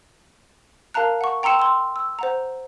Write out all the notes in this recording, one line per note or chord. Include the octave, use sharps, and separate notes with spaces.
A#4 F5 A5 A#5 F#6
F#5 C#6
G5 A#5 C6 E6 C#7 E7
C6 E6
E6
C5 F#5 A#5